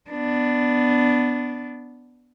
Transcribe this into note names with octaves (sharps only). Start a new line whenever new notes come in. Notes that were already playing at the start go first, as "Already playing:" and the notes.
B3 D4